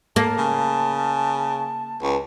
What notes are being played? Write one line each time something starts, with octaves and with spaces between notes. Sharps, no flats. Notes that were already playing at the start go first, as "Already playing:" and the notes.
A#3 A5
C#3
C#2